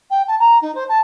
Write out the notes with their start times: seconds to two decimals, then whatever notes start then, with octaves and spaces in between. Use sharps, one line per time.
0.10 G5
0.27 A5
0.39 A#5
0.61 D#4
0.74 C5
0.88 A5